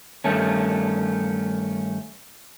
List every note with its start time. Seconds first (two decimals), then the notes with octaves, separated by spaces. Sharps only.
0.24 G2 D#3 A3 C#4